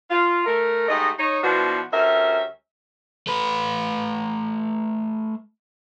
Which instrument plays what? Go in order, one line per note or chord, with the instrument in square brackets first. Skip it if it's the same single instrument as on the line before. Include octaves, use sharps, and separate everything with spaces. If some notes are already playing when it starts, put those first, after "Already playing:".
[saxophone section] F4
A3 A#4
G#2 A3 G4 D#5
D#4 C#5
B2 F3 B3 D4 E4 F#4
D2 G3 C#4 A#4 E5
[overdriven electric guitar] A3 B4